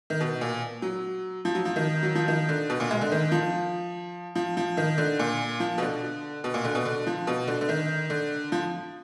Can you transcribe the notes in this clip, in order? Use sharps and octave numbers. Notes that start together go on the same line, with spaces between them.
D#3
B2
A#2
F#3
F3
F#3
F3
D#3
F#3
F3
D#3
D3
B2
A#2
G#3
D3
D#3
F3
F3
F3
D#3
D3
A#2
F3
B2
D3
B2
A#2
D3
B2
D3
F3
B2
D3
D3
D#3
D3
F3